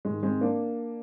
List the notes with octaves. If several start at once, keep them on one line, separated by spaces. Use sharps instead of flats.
G#2 D#3 G#3
G#3 C4
A#3 D4